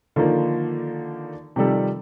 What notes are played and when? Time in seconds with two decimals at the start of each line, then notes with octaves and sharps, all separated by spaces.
0.16 D3 D#3 F3 A#3
1.56 C3 D#3 F3 G3 A4